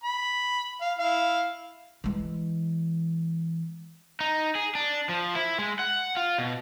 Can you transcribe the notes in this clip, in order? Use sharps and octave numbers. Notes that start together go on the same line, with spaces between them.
B5
F5
E4 F5
E3 G#3
D#4
G#4
D4
F3
E4
G#3
F#5
F4
B2